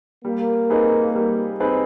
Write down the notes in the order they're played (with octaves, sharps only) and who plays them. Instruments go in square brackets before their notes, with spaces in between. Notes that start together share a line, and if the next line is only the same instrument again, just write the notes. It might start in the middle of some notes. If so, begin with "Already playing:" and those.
[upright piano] G3 [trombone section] A#3
[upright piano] C4 D#4 G#4 B4
G3
C4 D#4 G#4 B4